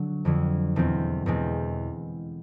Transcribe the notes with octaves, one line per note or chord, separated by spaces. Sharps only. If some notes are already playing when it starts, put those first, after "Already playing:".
Already playing: D3 F#3
F2 D3 F#3
E2 B2 G#3 C4
E2 B2 G#3 C4